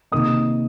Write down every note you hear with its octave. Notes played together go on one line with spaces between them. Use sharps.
C3 D#3 A#3 D#4 D#6